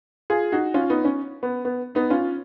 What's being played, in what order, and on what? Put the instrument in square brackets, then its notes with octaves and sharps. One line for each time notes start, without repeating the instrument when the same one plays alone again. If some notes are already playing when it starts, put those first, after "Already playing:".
[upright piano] F4 G#4
D#4 F#4
C#4 F4
B3 D#4
C#4
B3
B3
B3 D#4
C#4 F4